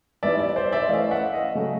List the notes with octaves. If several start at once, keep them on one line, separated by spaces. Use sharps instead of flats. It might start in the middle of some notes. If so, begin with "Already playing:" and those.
E3 G3 B3 D#4 D5 E5
D5 E5
C5 D5
D5 E5
E3 A3 C#4 D#5 F5
E5 F#5
D#5 F5
C#3 F#3 A3 C#4